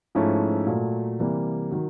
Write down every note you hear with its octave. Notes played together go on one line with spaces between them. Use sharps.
G#2 F3 A3 C#4 E4
A#2 F#3 A3
C3 E3 G3 A#3
D#3 F#3